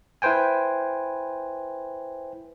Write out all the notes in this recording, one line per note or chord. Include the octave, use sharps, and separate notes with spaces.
E4 B4 C5 G5 G#5